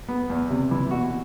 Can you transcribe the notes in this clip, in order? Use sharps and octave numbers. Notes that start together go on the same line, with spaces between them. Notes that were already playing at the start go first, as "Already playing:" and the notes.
B3
E2
C3
E3
B2 F#4